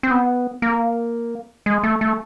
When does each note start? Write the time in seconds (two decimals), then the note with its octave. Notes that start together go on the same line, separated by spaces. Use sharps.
0.03 C4
0.11 B3
0.62 A#3
1.66 G#3
1.83 A3
2.01 A3